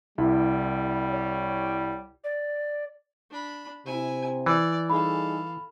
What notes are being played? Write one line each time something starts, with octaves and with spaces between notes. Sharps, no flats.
C2 G3 E4 B5
C#5
D5
D4 B5
C3 E4 G#5
E3 D5
G3 D#4 G#4 A4 F5 B5